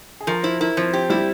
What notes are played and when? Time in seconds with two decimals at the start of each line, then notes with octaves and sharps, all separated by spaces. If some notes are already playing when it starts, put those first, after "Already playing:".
0.21 G#4
0.27 F3 A#4
0.43 E4 C5
0.60 E4 A#4
0.77 F3 C4
0.93 C4 G4
1.10 G3 E4